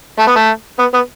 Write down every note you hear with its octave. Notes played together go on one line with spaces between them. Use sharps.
A3
B3
A3
B3
B3